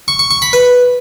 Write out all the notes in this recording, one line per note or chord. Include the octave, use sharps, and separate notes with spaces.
C#6
C#6
C#6
B5
B4